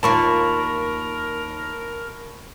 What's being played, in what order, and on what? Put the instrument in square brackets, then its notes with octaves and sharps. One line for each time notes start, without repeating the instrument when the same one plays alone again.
[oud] D#2 A#3 F4 [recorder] A#4 [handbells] A5 B5 C#6